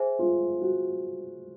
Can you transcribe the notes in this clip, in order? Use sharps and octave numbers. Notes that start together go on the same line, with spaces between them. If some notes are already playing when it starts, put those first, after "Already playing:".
Already playing: G#4 C5 E5 G#5
F4
F#4